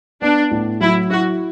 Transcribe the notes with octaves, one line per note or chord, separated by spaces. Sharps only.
B3 D4
A2
F#3 E4
E4 F#4